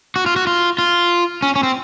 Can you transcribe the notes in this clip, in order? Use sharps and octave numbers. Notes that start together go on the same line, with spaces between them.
F#4
F4
F#4
F4
F4
C#4
C#4
C4